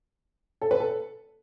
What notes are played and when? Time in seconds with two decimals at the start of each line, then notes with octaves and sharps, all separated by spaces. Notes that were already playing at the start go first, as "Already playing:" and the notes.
0.61 A4
0.71 B4
0.80 A4